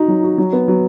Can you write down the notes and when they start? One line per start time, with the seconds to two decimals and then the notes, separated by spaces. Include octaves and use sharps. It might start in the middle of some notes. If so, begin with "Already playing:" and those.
Already playing: D#4 F#4
0.08 F#3
0.23 F#4
0.38 F#3
0.52 B3
0.68 F#3